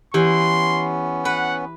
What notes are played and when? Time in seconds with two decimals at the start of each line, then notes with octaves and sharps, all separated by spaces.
0.14 E3 B3 C#4 G4 C6
1.25 B4 F#5